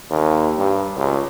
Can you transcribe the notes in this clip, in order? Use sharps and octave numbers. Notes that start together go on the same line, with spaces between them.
D#2
G2
C#2